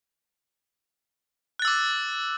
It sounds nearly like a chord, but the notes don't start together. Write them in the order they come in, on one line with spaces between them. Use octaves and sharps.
F#6 A6 E6 D6